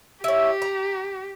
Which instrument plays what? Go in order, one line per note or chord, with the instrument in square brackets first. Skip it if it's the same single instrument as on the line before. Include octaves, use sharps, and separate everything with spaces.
[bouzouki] E4 C#5 [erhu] G4
[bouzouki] A#5